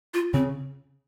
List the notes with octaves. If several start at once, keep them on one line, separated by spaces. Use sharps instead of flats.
F4
C#3 C4